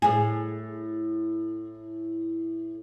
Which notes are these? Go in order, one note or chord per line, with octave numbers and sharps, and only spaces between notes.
A2 G#4